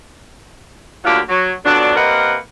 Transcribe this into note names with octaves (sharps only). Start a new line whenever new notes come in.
D2 A#2 F#3 D4 F4 G4
F#3
F2 B2 F#3 D4
C3 A#3 A#4 B4 D#5 F#5